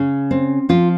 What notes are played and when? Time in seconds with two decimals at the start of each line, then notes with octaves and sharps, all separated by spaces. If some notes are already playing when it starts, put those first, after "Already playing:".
Already playing: C#3 C#4
0.31 C4
0.69 F3 F4